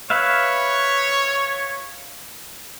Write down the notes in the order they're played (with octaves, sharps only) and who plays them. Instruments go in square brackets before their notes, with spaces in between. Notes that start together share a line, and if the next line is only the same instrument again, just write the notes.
[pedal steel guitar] B4 E5 F5 [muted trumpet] C#5